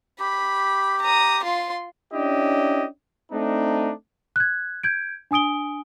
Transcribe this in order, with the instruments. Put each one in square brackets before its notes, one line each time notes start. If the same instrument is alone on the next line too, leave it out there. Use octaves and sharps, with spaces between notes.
[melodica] G4 [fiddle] B5
[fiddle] A#5 D#6
F4 C6
[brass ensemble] C#4 D4 E4 G4 D#5
A3 C4 D4 D#4
[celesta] F#6 G#6
G6 G#6 D7
D4 G#5 D#6 D7 G7